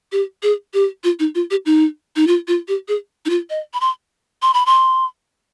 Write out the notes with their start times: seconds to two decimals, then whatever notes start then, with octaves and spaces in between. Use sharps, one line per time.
0.12 G4
0.43 G#4
0.74 G4
1.04 F4
1.19 D#4
1.35 F4
1.51 G4
1.66 D#4
2.16 D#4
2.27 F4
2.48 F4
2.68 G4
2.88 G#4
3.25 D#4
3.30 F4
3.50 D#5
3.74 B5
3.81 C6
4.42 C6
4.54 B5
4.66 C6